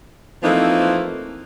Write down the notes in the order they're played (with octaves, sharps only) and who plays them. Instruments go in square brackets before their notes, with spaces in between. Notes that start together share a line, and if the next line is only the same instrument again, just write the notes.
[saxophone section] E3 F3 A3 A#3 C4 D#4